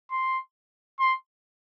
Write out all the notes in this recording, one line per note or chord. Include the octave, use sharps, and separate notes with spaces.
C6
C6